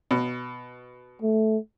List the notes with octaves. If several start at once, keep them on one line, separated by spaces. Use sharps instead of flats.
B2
A3